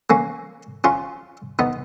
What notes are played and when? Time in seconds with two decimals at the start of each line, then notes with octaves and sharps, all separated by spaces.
0.10 A#3 C#4
0.84 C#4 F4
1.59 B3 D#4